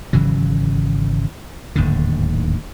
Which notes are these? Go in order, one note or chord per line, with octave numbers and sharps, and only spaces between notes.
G#1 C#3 E3 F#3
D1 D#2 G#2 D3